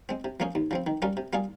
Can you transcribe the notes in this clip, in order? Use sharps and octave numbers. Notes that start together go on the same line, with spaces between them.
G#3 C4
C3
F3 A#3 C#4 G#4
D#2
C#3 F3 C4
D#3
G3 C#4 F4 A#4
C3
G3 A#3 F4 G#4